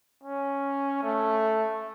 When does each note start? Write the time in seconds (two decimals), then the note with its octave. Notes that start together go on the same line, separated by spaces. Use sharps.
0.23 C#4
1.03 A3